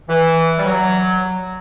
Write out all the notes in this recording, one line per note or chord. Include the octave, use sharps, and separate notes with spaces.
E3
G3
F#3